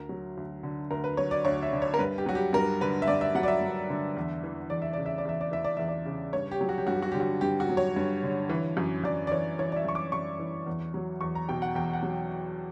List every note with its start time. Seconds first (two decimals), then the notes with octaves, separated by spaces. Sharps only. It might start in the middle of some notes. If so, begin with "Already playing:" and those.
Already playing: D2 A#4
0.09 F#3
0.37 D2
0.63 D3
0.91 D2 A#4
1.04 B4
1.17 F#3 C#5
1.31 D5
1.45 D2 C#5
1.63 E5
1.73 D3
1.82 C#5
1.94 A#4
1.99 G2 B4
2.18 G4
2.26 F#3 F#4
2.35 G4
2.53 G2 A#4
2.81 D3 B4
3.02 E5
3.08 G2 D5
3.21 E5
3.35 F#3 F#5
3.43 D5
3.48 E5
3.61 G2
3.90 D3
4.17 E2
4.43 E3
4.70 E2 D5
4.82 E5
4.93 C#3 D5
5.06 E5
5.18 D5
5.25 E2 E5
5.41 D5
5.51 E3 E5
5.65 D5
5.77 E2 E5
5.88 D5
6.05 C#3
6.33 G2 C#5
6.51 G4
6.61 F#3
6.69 F#4
6.78 G4
6.87 G2 F#4
6.95 G4
7.02 F#4
7.12 D3 G4
7.20 F#4
7.41 G2 G4
7.60 F#4
7.69 F#3
7.77 C#5
7.96 G2
8.23 D3
8.49 E3
8.77 F#2
9.04 F#2 D5
9.27 D5
9.31 E3 C#5
9.59 E3 C#5
9.72 D5
9.76 E5
9.85 F#2 C#6
9.95 D6
10.12 F#2 C#6
10.39 E3
10.67 E2
10.94 F#3
11.21 E2 C#6
11.35 A#5
11.49 B2 G5
11.62 F#5
11.75 E2 G5
11.93 F#5
12.03 F#3